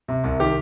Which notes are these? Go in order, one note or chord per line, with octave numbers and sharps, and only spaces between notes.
C3
C2
D#3 G4